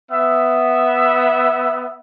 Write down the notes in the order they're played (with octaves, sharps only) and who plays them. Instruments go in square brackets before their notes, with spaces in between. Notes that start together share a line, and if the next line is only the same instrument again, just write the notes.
[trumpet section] B3 E5